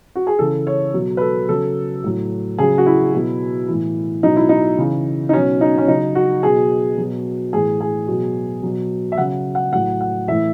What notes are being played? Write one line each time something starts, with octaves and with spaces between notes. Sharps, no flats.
F#4
G#4
C#3 E3 A4
C#5
B2 F#3
B4
A4
C#3 F#3 A4
A2 F#3
C#3 F#3 G#4
F#4
E4
B2 F#3
A2 E3
B2 F#3 D#4
E4
D#4
C#3 E3
D#4
B2 F#3 C#4
D#4
C#4
C#3 F#3 D#4
F#4
B2 F#3 G#4
B2 F#3
A2 E3 G#4
G#4
B2 F#3
B2 F#3
E5
C#3 F#3 F#5
F#5
A2 F#3 F#5
F#5
A2 E3 E5